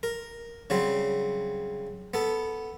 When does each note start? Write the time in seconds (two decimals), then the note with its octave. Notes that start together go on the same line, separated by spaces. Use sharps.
0.03 A#4
0.70 C#3 F#3 G3 C4
2.14 B3 A4